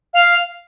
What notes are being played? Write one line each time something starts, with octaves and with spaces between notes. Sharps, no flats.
F5